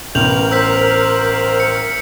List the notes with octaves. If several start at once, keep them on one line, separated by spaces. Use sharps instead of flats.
A1 B3 A#4 G6 F7 F#7
C5 E6 G6 B6
C#7